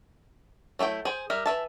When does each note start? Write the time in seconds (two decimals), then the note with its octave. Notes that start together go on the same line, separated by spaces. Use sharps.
0.79 F#3 A3 E4 G5
1.05 G#4 C5 G5
1.30 G3 A#4 E5
1.46 E3 E5 A5